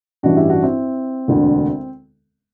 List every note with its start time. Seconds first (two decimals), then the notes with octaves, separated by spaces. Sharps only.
0.23 A1 G2 E3 D4 F#4
0.36 E4 G4
0.49 D4 F#4
0.63 C4 E4
1.28 E1 D2 D3